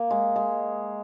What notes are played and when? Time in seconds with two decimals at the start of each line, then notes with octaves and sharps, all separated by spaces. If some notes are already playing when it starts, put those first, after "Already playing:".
Already playing: A#3
0.11 G#3
0.36 G#3